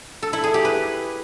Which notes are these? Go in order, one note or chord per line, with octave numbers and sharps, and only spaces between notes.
A4
E4
G#4
G4
B4